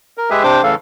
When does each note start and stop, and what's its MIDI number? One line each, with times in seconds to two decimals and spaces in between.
0.18 0.30 70
0.30 0.43 56
0.30 0.43 67
0.30 0.43 68
0.30 0.43 71
0.30 0.43 76
0.43 0.62 48
0.43 0.62 62
0.43 0.62 72
0.43 0.62 79
0.43 0.62 86
0.63 0.75 45
0.63 0.75 49
0.63 0.75 52
0.63 0.75 69
0.63 0.75 77